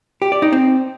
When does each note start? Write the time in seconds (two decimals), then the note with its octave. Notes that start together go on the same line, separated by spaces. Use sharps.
0.22 G4
0.32 D5
0.42 D#4
0.52 C4